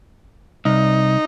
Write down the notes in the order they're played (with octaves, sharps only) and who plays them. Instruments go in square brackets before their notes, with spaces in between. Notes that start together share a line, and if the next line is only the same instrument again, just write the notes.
[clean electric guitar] C2 [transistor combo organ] D#4